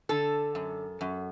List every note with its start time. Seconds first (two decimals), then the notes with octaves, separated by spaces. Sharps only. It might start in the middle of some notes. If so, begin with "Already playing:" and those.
0.09 D3 A4
0.55 F#2
1.01 F#2